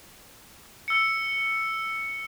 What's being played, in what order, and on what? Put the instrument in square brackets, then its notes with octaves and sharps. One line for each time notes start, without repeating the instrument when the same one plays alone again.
[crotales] E6 C#7